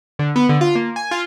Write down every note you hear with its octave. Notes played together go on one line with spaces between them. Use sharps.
D3
B3
D3
F4
A#3
G#5
F4